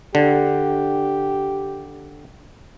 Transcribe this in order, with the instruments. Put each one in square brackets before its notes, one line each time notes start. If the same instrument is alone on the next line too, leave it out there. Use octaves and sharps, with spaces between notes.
[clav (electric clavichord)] D3 [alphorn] G4